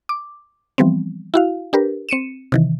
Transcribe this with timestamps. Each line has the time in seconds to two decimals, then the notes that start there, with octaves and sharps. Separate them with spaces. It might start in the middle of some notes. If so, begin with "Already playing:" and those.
0.09 D6
0.78 E3 F3 G3 B3 C4
1.34 E4 F#4 F5
1.73 D4 G4 A#4 B4
2.09 C4 C#7 D#7 E7
2.52 C3 D#3 E3